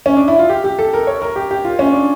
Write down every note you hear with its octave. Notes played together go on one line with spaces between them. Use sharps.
C#4
D4
E4
F4
G4
G4
A4
A#4
C#5
A#4
G4
G4
F4
C#4
D4